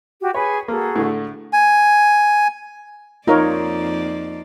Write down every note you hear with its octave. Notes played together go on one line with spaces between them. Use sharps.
F#4 G4
G#4 B4 C#5 G#5
A#3 F#4 G#4 A4
A2 D3 A3
G#5
F2 A#3 D#4 F4 A#4 C#5 D5